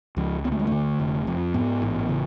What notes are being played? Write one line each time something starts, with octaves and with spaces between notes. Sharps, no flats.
C#2 F3
D2 B3
A3
G#3
D3 A3
F1
F2
G#2 B3
A1
C#3